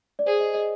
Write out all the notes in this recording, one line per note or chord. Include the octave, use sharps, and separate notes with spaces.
D5
G#4 C5
D#5
D#5